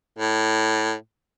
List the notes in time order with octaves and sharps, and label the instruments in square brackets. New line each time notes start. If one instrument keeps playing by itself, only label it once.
[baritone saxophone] A2